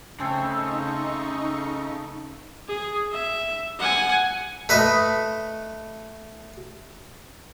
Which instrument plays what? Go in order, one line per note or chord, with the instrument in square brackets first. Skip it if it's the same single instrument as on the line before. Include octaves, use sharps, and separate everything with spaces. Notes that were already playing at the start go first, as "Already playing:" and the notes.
[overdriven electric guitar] C#3 [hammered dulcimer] A3 C4 A4 [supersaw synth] D#4 C#6
[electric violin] G#4
E5
F#5 G#5
[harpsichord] A3 B4 D#5